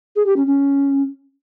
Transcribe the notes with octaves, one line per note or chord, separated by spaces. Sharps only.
G#4
G4
C#4
C#4